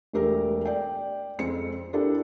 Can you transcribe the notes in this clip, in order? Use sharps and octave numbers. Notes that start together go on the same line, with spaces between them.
E1 A3 G4 A#4
D5 G5
F2 G#3 C4 C#7
D4 E4 G4 A4 A#4 E5